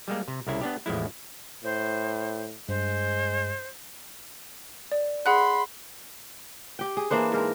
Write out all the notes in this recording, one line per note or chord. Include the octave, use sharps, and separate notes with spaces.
G3 G#3 A#3
C3
C2 C#3 E4
B3 D4 G4
A1 E2 F3 G#3 E4
A2 C5
G2 G#3 C5
D5
G#4 F#5 B5 C6 F#6
G4 G5
G#4
E3 A#3 D4 C5
G#2 A#4